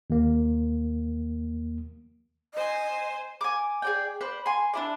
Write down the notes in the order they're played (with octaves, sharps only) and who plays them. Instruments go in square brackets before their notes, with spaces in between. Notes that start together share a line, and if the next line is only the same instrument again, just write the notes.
[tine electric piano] D#2 A#3
[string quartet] C5 G#5 C6 [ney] D#5
[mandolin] G#5 D6
G#4 D5 G5
B4 C5 D5
G#5 C6
D4 E4 D5